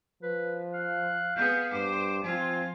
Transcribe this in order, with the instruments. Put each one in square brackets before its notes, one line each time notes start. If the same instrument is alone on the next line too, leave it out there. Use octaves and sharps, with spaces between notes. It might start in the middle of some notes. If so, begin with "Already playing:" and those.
[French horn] F3 [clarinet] B4
[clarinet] F5 [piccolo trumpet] F#6
[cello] B3 G#4 [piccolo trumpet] G6
[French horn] G2 [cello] C5 [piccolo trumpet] D6
[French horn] F3 [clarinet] C4 [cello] F4 [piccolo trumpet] G#5